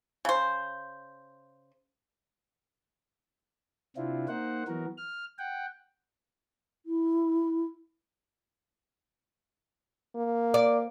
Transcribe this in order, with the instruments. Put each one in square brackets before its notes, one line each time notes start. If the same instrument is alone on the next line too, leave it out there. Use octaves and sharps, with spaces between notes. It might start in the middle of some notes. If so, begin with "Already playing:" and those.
[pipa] C#3 C5
[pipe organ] C3 C4 D4 E4 F4
A#3 D#4 C5 F#5
E3 F#3 B3 F#4 A#4
F6
F#5 G5
[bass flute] E4
[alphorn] A#3
[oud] D5